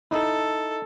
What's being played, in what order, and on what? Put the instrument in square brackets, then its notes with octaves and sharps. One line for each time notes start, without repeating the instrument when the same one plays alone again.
[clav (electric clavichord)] D#4 E4 [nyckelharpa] A4